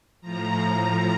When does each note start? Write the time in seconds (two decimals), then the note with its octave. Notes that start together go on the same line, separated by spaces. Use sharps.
0.21 A2 F3 A#5